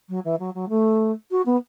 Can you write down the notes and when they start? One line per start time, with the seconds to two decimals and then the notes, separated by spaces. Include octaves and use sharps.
0.09 F#3
0.25 E3
0.40 F#3
0.55 F#3
0.69 A3
1.31 F#4
1.46 B3